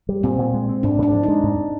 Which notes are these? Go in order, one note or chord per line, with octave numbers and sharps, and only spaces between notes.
G3
A#2 C4
A#2
G#3
C4
G#2 D4
G#2 D4
F3
G#3 D#4
G#2